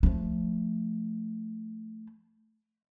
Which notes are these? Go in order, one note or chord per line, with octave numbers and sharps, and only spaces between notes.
F3 A3